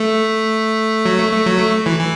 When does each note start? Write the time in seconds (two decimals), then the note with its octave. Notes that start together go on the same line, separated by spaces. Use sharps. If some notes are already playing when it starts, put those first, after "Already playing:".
Already playing: A3
1.06 F#3
1.19 A3
1.32 A3
1.45 F#3
1.59 A3
1.86 E3
1.99 E3